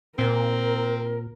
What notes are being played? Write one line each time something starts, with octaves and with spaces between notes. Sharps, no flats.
A#2 C4 A#4